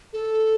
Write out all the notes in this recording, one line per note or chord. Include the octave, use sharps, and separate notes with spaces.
A4